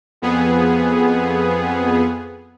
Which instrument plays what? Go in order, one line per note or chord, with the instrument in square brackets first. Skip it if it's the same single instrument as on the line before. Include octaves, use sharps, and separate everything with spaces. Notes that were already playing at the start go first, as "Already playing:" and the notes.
[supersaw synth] F2 B3 G#4